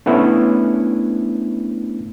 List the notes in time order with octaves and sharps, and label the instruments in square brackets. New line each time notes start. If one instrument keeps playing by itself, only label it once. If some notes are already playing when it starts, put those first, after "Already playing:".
[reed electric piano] A3 B3 C#4 D4 E4